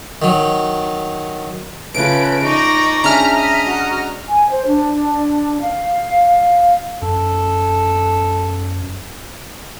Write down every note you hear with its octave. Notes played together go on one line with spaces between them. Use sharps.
D#3 F#3
C#3 A3 F4 B4 D7
D#4 D5 C#6 A#6
G#3 C#4 D4 E5 A#5 F6
D#5
F#4
G#5
C5
D4
F5
F#2 A4